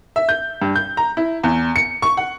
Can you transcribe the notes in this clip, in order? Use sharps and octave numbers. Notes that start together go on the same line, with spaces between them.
E5
G6
G2
G6
A#5
E4
E2
C#7
C#6
F#5